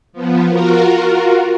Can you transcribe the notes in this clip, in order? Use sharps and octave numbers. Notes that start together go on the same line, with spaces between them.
F3 B3
F4 F#4 A#4